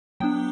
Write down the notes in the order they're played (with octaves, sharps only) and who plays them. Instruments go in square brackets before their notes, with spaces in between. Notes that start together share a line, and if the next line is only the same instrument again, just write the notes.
[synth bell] F#3 B3 D4 G5